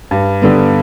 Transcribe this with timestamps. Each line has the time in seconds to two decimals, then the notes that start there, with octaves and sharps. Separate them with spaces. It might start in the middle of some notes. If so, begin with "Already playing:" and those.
0.11 G2
0.42 D3 G3 B3